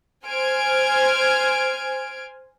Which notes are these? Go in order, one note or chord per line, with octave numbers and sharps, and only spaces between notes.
C5 G#5 F6 G#6 D7